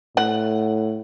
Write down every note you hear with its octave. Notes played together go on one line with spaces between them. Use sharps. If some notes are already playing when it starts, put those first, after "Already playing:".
A2 F#5